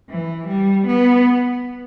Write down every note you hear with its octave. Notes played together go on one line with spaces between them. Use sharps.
E3
G3
B3